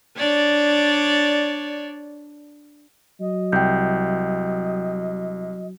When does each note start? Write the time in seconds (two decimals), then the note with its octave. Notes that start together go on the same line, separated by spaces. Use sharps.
0.17 D4 C#5 D5
3.20 F#3 D#5
3.52 C2 G5 G6